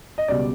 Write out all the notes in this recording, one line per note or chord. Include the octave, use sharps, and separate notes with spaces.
D#5
C#2 B2 G3 D5